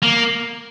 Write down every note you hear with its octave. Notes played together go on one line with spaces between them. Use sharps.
A#3